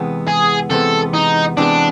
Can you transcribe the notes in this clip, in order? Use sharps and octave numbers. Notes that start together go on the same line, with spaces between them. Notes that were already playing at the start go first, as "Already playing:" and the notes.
Already playing: E2 C3 E3 G#3 B3
G#4
E2 C3 E3 G#3 B3 A4
D#4
E2 C3 E3 G#3 B3 D4